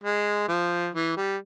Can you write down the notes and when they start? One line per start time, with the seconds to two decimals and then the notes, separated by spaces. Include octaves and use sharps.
0.04 G#3
0.48 F3
0.95 E3
1.17 G3